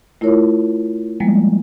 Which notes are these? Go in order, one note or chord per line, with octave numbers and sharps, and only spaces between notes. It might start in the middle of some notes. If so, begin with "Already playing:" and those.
A3 E4 F4 A#4 C#5
F3 G3 G#3 A#3 B3